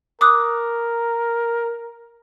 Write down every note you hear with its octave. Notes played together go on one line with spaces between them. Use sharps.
A#4 D6 D#6 F#6